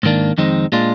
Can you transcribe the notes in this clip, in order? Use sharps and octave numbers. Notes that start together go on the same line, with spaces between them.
G#2 D#3 A#3 D4
F2 D#3 G#3 C4 D#4
A#2 G#3 D4 F4